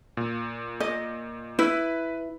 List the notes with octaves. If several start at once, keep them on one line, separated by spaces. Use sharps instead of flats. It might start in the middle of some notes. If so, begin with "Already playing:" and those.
A#2
D#5
E4 B4